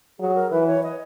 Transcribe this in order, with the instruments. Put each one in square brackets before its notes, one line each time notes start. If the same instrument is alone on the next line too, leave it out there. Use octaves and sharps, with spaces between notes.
[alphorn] F#3 [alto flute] G#4
[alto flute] A#4
[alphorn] E3 [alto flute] B4
[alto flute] C#5
D#5